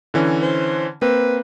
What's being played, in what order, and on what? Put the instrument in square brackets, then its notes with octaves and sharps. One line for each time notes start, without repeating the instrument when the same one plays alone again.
[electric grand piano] D3 E3 C#4
[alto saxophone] C5
[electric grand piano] A#3 C4 [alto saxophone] B4